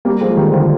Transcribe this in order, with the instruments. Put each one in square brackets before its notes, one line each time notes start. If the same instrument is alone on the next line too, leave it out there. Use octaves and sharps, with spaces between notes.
[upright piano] G3 A#3
F3 G#3
D#3 G3
D3 F3